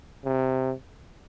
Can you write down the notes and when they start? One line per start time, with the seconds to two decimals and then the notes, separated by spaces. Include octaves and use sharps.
0.24 C3